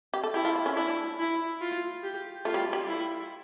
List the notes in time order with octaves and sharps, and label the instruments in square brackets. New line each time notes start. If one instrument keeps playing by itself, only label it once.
[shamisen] G4
A4
[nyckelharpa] E4 [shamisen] G4
[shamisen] F4
E4
C#4
[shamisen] D4 [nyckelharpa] E4
[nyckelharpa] E4
F4
G4
[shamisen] A3 [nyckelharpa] F4
[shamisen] G3
G3
[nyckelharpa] E4